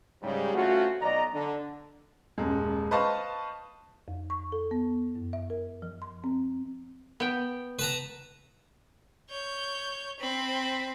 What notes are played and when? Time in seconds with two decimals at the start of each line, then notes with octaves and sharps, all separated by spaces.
0.22 G#2 C#3 G3
0.54 A3 C4 C#4 F4 F#4
1.01 B1 D5 D#5 A#5
1.33 D3
2.38 D#1 F#2 G#3
2.91 B4 C5 D#5 F5 A5 C#6
4.08 F2
4.30 C#6
4.52 A4
4.71 B3
5.15 F#2
5.33 E5
5.50 A#4
5.82 F3
6.02 C6
6.24 C4
7.20 B3 G5
7.79 B4 A5 A#5
9.30 C#5 G6
10.19 C4 B5